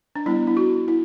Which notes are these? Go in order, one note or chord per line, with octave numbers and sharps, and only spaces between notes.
D4
G3 B3 D4 E4
E4
F#4
E4